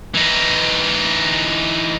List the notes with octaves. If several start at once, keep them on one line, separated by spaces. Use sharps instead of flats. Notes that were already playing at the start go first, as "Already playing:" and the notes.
E3 D#4